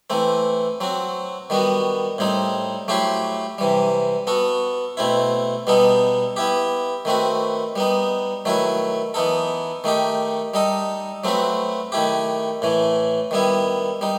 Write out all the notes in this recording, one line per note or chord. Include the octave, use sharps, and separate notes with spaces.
E3 A3 C4
F#3 C4 F#4
D#3 G3 B3 F#4
A2 G3 C4 D#4
F#3 A3 E4 G4 C5
C3 E3 G3
B3 F#4 A4
B2 A3 C4 E4
B2 G3 B3 D#4 A4
B3 E4 G4
D#3 A3 C4 F#4 B4
G3 B3 D#4
D#3 F#3 A3 E4 B4
E3 B3 D#4 A4
D#3 A3 D#4 G4
G3 D#4 A4 D#5
F#3 A3 C4 F#4 B4
D#3 A3 E4 G4
A2 E3 A3
D#3 G3 B3 E4
G3 D#4